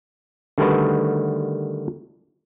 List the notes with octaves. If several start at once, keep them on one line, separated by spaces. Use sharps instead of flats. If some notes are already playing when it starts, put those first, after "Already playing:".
D3 D#3 G3 A3 F#4 B4